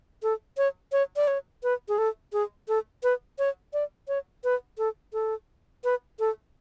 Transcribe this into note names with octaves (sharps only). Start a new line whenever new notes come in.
A4
C#5
C#5
D5
C#5
B4
G#4
A4
G#4
A4
B4
C#5
D5
C#5
B4
A4
A4
B4
A4